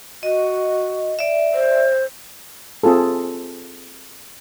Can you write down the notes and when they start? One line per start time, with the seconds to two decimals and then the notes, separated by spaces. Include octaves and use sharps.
0.23 F#4 D#5
1.19 D5 E5
1.54 C5
2.83 C4 F4 G#4 A4